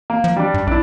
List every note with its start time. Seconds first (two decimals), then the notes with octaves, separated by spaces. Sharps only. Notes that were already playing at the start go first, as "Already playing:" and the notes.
0.10 A#3
0.24 F3
0.36 G3 D4
0.54 G2
0.67 B1 D4 E4